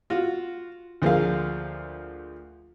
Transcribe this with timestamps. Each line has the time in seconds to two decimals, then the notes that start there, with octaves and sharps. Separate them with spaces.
0.10 F4 F#4
1.02 D2 F3 A#3 G#4 F5